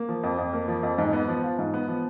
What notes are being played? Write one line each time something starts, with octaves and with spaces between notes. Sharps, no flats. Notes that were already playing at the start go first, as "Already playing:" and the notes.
Already playing: A#3
F3
F2
F2
A#3
F3
F2
G#2
B3
F3
F4
G#2
B3
F3